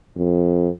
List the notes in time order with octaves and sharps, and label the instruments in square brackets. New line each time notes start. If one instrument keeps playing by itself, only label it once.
[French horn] F2